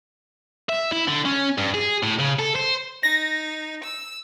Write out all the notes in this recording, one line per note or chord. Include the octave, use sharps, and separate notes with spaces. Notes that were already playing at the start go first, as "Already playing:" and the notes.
E5
E4
D3
C#4
G2
G#4
A2
C#3
A4
C5
D#4 A#6
E6